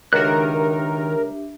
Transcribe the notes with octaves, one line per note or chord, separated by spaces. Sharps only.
C#2 D#3 D4 F#4 G4 A#4 E5 F#6